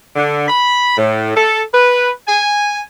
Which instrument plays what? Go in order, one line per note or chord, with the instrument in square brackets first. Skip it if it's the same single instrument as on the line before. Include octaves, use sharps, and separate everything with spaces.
[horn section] D3
B5
A2
A4
B4
G#5